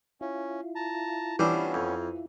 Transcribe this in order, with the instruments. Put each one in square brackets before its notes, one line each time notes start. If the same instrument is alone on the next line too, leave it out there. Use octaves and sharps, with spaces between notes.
[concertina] C#4 [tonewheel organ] E4 F4
[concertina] A5 A#5
[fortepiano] E3 [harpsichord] G3 D4 C5 [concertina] B3 C#4
[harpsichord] F2